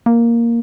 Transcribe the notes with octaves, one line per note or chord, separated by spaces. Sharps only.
A#3